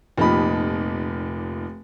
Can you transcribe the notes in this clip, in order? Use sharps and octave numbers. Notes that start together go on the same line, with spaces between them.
F1 A#2 F3 D#4 G4 B5